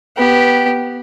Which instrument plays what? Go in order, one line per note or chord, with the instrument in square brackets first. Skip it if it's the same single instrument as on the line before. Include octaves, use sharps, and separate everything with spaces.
[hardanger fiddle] B3 G4